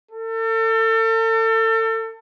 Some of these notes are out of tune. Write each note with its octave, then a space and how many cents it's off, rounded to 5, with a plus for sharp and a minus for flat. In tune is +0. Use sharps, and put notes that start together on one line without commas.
A4 +35